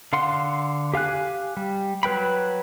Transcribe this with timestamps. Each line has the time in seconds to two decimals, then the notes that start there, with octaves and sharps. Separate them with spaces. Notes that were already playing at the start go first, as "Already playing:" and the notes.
0.13 D3 F5 F#5 C6
0.94 G4 F5 G#5 F#6
1.57 G3
2.03 F#3 B4 G5 B5